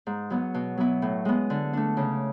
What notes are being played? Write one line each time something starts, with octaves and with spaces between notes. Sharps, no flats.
G#2
F#3 B3
B2
F#3 B3 E4
A2
G#3 B3
D3
A3 D4
C#3